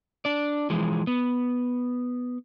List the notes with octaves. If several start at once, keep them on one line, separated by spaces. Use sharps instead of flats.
D4 D5
E3 F3 G#3
B3